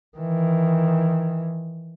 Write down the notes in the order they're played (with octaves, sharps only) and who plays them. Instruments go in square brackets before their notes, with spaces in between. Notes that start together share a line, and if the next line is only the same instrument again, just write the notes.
[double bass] D#3 E3